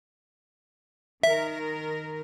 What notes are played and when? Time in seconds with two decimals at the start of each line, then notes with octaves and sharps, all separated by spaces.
1.23 D#3 A#4 E5